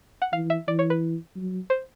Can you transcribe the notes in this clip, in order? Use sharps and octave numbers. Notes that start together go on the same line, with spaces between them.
F#5
E3 F5
E5
E3 D5
C#5
B4
F#3
C5